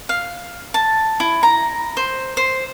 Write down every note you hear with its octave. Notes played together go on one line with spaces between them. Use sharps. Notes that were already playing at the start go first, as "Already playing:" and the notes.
F5
A5
E4
A#5
C5
C5